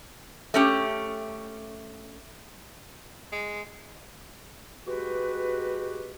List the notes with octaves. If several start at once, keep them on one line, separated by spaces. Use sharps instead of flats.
A3 C#4 G4
G#3
G#3 F#4 G4 B4